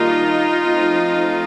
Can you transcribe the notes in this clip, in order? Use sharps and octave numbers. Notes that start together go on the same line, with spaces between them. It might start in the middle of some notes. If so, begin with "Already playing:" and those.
Already playing: D#3 G3 A#3 D4 D#4 F4
F3 A3 C4